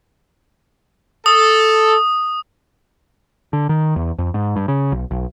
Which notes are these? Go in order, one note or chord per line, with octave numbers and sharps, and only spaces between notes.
A4 D#6
D3
D#3
E2
F2
G#2
G2
C#3
B1
B1